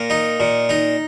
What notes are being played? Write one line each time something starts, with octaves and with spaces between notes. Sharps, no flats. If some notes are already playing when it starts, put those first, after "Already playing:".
Already playing: A#2 A#4
D#4
A#2
D#4